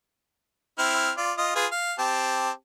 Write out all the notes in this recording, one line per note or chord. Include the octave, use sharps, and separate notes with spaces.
C4 E4 F6
F4 D5
F4 D#5
F4 G#4 B4
F5
C4 G4 A5